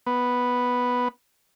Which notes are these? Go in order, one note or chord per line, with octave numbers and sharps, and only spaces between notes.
B3